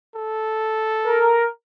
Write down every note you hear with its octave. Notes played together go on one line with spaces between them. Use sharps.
A4
A#4